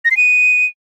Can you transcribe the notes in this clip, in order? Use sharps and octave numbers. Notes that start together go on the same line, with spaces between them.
A#6
C7
D#7